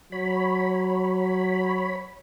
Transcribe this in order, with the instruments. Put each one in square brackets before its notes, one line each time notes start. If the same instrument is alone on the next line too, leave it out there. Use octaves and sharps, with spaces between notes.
[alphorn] F#3 [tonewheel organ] C#5 B5